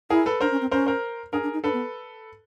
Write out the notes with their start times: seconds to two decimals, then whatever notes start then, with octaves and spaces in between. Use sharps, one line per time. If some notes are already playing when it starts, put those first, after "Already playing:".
0.10 E4 G#4 A#4
0.26 A4 B4
0.41 D4 A#4 C5
0.51 C#4
0.61 C4
0.71 C#4 A#4 C5
0.87 A#4 C5
1.33 D4 G#4 A#4
1.43 D4
1.53 D#4
1.64 D4 A4 B4
1.73 B3